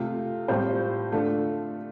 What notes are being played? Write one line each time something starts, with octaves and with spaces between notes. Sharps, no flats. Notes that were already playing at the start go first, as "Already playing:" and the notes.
Already playing: C3 A3 F4 A4
A2 G3 C4 F4 C5
D3 A3 F4 A4